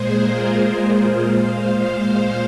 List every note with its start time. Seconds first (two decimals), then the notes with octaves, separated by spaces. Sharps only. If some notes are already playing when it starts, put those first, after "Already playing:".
Already playing: A#2 G#3 G#4 C5
0.19 F4 A#4
0.54 G#4 C5
1.25 A#2 G#3 C5 F5